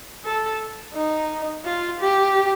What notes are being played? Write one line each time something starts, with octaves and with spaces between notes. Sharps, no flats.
A4
D#4
F4
G4